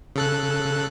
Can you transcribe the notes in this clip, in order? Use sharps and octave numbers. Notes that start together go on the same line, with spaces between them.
C#3 A4 F#6